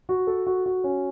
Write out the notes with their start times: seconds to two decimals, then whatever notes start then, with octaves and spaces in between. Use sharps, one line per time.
0.09 F#4
0.27 A4
0.46 F#4
0.66 F#4
0.84 C#4